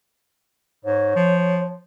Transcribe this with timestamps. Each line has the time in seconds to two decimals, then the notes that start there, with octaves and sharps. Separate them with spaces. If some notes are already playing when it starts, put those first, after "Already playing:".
0.85 G#2 C#5
1.16 F3